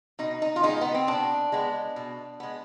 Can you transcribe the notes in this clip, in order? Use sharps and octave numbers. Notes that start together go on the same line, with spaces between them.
B2 D#4
D#4
F4
G#3 B3 D#4
B3
C4
B2 D4
G#3 B3
B2
G#3 B3